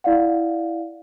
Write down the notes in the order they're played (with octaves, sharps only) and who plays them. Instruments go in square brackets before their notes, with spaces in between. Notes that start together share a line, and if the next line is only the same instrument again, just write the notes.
[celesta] E4 D5 F5 F#5